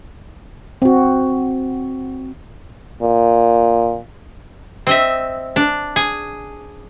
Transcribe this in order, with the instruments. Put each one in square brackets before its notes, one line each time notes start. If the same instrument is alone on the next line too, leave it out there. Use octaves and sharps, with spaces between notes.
[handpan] C4 F#4
[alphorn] A#2
[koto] C4 D#5 E5
D4
G#4